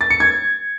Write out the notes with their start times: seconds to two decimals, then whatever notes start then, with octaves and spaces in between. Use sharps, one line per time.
0.01 A6
0.10 C#7
0.20 G#6